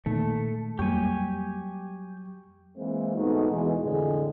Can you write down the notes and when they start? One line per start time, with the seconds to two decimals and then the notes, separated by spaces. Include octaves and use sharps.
0.06 A#2 D#3 A3
0.79 F2 F#3 G3 A#3 G4 G#5 C#6
2.77 E3 G#3 A#3 C4 E4
3.17 G#2 A3 B3 D#4 F#4
3.50 E2 B2 E3 G#3
3.83 F2 A2 D3 G#3